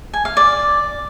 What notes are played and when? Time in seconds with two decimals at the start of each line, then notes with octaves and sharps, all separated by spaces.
0.14 G#5
0.25 F5
0.37 D5